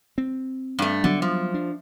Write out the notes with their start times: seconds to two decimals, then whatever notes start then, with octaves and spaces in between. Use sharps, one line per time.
0.18 C4
0.79 G2 A3
1.04 D3 F#3 G3 B3
1.22 F3
1.54 D4